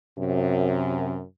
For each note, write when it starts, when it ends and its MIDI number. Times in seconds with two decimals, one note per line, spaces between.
0.18 1.20 42
0.18 1.20 48